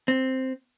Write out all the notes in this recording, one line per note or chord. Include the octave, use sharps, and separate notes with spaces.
C4